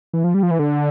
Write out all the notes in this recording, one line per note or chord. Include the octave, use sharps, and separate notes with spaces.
E3
F3
G3
F3
E3
D3